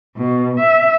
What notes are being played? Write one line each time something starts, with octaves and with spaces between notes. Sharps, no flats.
B2
E5